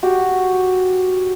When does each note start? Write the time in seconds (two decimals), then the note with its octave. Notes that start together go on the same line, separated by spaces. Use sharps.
0.03 F#4 G4